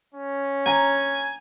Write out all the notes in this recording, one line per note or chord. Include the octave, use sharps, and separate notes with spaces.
C#4
G#5 A#5